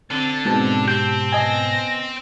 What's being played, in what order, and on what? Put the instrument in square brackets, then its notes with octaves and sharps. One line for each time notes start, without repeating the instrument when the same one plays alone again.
[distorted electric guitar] D3 [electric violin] C4 A6
[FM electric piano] G#2 B2 A5 [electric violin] C4
[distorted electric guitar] C4 [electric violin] G4 [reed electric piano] G6
[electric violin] B3 A#6 [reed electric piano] D#5 G#5